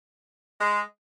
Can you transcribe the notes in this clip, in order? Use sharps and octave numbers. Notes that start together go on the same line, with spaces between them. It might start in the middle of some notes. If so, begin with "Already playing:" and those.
G#3